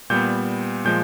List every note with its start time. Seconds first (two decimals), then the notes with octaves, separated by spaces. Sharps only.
0.10 A#2 G3 B3 G6
0.85 A#2 F3 G#3 G6